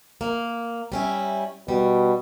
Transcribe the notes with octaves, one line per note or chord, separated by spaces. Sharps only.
A#3
G3 C#4 E4
B2 G3